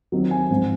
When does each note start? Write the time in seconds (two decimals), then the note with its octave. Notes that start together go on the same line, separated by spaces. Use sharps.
0.12 D#3 F#3 C4 D#4
0.31 G#5
0.50 G#2 F3 C4